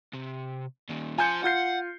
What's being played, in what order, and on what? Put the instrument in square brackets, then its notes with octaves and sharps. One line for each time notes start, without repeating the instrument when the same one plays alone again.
[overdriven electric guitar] C3
A#2 D#3
[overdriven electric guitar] F4 C5 [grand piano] G#5 G6 C#7
[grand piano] F4 G6 C7 [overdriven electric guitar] F#5